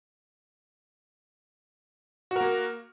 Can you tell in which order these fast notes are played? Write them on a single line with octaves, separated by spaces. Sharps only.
F#4 A#4 A#3